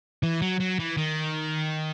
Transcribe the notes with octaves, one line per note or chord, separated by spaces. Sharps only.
E3
F#3
F#3
E3
D#3